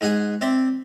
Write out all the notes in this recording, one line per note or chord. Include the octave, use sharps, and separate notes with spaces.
G#2 G#4 F#5 G#5
C4 D5 E5